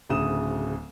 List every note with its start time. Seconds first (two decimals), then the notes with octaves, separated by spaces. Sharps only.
0.09 D1 D2 C#3 D#6 E7